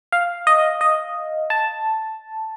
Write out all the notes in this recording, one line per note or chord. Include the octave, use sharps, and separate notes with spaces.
F5
D#5
D#5
A5